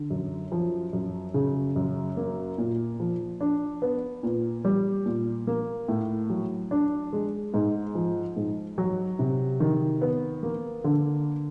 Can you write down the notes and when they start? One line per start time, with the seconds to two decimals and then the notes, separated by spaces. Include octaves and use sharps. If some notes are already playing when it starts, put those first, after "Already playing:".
Already playing: D3
0.10 F#2
0.52 F3
0.93 F#2
1.34 C#3
1.76 F#2
2.17 A#3
2.58 A#2
3.00 F3
3.41 D4
3.82 B3
4.23 A#2
4.65 G3
5.06 A#2
5.47 A#3
5.88 A2
6.30 F#3
6.71 D4
7.13 G#3
7.54 G#2
7.95 F3
8.36 G#2
8.78 F#3
9.19 C3
9.60 D#3
10.01 B3
10.43 A#3
10.84 D3